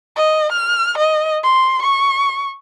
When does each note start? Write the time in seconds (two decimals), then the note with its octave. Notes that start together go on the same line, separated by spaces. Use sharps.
0.16 D#5
0.52 F6
0.98 D#5
1.43 C6
1.82 C#6